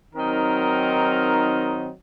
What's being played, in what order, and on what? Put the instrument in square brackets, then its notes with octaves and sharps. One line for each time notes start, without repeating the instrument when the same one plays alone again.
[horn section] D#3 F#3 C4 D#4 A#4